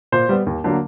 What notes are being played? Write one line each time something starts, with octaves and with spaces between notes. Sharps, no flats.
A#2 C5
G3 B3
D#2
D3 F#3 A#3